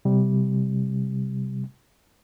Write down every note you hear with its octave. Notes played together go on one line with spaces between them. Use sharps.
C3 G3